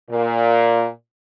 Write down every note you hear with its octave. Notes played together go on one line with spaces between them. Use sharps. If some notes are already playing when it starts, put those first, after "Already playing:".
A#2